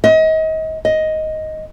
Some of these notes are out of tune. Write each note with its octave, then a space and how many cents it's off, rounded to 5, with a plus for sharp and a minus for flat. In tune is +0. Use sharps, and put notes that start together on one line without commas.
D#5 +35
D#5 +5